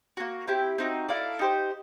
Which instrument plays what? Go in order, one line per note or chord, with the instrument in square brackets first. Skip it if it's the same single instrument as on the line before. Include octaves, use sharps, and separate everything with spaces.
[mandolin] A#3 C#4 F#4
C4 E4 G4
C4 D#4 F#4
E4 A4 D5 F5
D#4 G4 C5